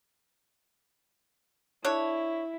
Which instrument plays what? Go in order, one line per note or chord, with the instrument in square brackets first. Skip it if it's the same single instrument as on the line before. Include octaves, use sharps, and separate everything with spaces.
[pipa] D4 A4 C#5 [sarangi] E4